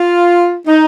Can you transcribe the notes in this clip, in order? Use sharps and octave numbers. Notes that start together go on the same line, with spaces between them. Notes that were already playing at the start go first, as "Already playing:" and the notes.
Already playing: F4
D#4